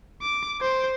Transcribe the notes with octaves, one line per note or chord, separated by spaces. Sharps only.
D6
C5